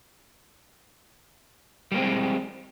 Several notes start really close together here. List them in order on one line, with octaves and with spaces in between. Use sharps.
G3 A#3 C4 G#3